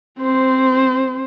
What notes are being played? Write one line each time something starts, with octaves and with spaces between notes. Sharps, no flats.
C4 C5